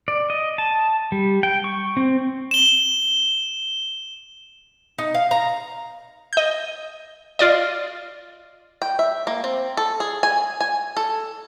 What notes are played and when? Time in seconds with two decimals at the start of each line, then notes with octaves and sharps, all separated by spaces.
0.08 D5
0.30 D#5
0.58 A5
1.12 G3
1.43 G5
1.64 C#6
1.97 C4
2.51 E7 G7
4.99 D#4
5.14 F5
5.31 A#5
6.33 D#5 G6
7.39 F4 D5 D#5
8.82 G5
8.99 E5
9.27 A#3
9.44 C4
9.77 A4
10.00 G#4
10.23 G#5
10.61 G#5
10.97 A4